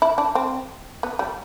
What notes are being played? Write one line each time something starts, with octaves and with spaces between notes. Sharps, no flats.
E4
D4
C4
B3
G3